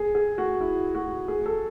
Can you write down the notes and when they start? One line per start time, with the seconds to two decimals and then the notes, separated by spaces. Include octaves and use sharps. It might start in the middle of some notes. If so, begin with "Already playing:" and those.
Already playing: G#4
0.15 G#4
0.38 F#4
0.61 E4
0.95 F#4
1.28 G#4
1.46 A4